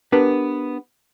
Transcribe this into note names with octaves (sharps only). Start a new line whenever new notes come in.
B3 D4 G4 A#4 B4